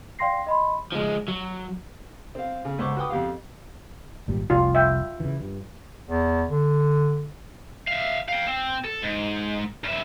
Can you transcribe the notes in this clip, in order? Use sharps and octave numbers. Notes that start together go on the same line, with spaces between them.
D5 F5 G5 C6 A#6 C7
D#5 B5 C6
F3 G#3
F#3
C4 F5
C#3
C#2 C5 F#5 C#6 D6
F#4 B4 G5 D6 D#6
F2 G4 F5
G#1 A#2 G3
F1 C2 F4 D5
E5 G5
C#3 E3
G2
E2
D3
E5 F5
F5 G5
C4
A4
G#2
G2 E5